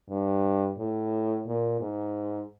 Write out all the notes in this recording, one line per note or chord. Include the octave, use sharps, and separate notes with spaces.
G2
A2
A#2
G#2